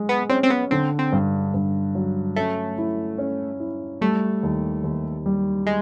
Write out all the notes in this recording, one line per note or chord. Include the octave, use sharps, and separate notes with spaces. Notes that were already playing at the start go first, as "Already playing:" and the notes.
Already playing: G#3
B3
C4 C#4
C4
B3
D3 C4
C4
G2
G2
F#3
A3 C#4
E4
C#4
E4
G3 A3
D#2
D#2
G3
G#3